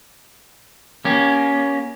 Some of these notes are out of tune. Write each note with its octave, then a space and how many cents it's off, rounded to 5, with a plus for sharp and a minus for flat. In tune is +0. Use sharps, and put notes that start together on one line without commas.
A#3 +25 C#4 +15 G4 +0